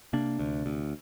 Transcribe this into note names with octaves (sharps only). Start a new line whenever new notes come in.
C3 A#3 D4
D2
D2